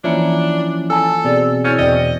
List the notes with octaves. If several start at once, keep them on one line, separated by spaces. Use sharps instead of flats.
E3 F3 A#3 C#4 D4 E4
A4 G#5 A5
B2 C4 G#4 D5 A6
C#4 E4 C5 G6 A6 C#7
E1 D5 D#5 G5